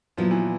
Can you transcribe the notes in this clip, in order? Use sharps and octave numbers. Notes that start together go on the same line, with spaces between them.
A#2 F3 F#3 B3 E4
E3